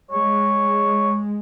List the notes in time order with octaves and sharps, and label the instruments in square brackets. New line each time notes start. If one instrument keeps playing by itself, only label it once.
[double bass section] G#3 [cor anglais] C#5